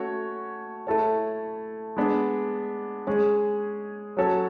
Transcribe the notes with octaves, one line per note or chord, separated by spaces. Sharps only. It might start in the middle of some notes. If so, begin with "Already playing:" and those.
Already playing: A3 C#4 F#4 C#5
A3 E4 A4 C#5
G#3 B3 D4
G#3 C#4 G#4 C#5
F#3 C#4 F#4 A4 C#5